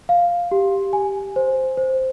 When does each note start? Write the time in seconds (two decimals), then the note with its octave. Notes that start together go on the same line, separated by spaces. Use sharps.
0.09 F5
0.51 G4
0.93 G#5
1.36 C5
1.77 C5